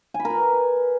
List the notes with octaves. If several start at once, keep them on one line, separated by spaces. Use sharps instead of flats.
G#5
B5
A#4
B4